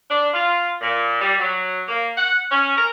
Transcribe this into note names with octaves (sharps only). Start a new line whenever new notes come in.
D4
F4
A#2
G3
F#3
A#3
F#5
C#4
A#4